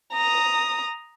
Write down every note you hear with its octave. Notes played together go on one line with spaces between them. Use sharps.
A#5 D#6